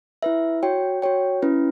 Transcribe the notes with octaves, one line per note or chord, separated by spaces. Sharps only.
E4 B4 E5
F#4 C#5 G5
F#4 C#5 G5
C#4 E4 B4